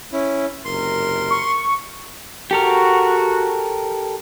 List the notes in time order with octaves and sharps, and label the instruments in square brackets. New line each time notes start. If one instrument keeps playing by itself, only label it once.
[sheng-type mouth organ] C#4 E4
[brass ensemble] F#1 C3 A#4 [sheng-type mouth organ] C6
[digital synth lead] C#6
[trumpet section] F#4 [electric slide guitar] G4 A4 A#4